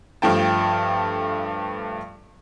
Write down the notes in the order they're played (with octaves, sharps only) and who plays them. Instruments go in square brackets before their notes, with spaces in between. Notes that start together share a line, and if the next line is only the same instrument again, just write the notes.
[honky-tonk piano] G2 F3 A3 G5 A5